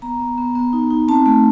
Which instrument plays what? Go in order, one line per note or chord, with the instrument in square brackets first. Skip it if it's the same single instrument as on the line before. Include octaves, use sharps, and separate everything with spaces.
[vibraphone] B3 A#5
B3
B3
B3
D#4
D#4
C4 A5
A3